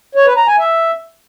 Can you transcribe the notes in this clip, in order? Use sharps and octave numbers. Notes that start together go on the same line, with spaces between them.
C#5
B4
A#5
G#5
E5